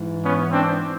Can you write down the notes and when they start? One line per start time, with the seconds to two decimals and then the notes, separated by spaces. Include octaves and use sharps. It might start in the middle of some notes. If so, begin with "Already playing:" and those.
Already playing: G#2 E3
0.24 B3 C#4
0.51 C4 D4